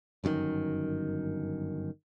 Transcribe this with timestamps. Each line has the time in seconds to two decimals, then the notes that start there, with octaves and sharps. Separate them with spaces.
0.24 G1 F#2 B2 D#3